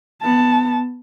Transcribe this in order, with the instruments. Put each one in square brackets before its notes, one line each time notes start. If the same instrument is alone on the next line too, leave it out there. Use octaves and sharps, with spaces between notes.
[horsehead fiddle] B3 A5